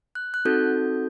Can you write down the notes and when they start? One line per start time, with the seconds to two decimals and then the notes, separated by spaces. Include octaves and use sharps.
0.15 F#6
0.34 F#6
0.45 C4 D#4 F#4 A4 G6